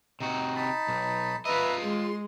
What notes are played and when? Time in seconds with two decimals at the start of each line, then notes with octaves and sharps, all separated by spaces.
0.20 C3 D#4 F#4
0.56 D#4 A5 B5
0.88 B1
1.45 F4 B4 D#5 E5 A#5
1.82 G#3 C6